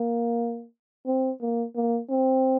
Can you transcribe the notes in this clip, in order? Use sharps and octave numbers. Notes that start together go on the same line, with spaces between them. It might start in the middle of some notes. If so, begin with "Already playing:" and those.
Already playing: A#3
C4
A#3
A#3
C4